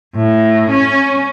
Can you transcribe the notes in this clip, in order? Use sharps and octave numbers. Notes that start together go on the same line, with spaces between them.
A2
C#4